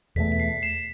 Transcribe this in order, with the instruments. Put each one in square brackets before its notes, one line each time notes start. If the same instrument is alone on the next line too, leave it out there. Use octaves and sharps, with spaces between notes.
[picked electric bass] E2 B2 A3 [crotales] B6
[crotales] B6
C7
C7 E7